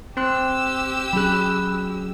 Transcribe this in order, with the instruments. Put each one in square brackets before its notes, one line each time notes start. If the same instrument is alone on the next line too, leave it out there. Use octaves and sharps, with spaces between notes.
[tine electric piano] C4 C6 F#6 [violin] G4 E6
[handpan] F#3 C#4 G#4 [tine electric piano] B5 F#6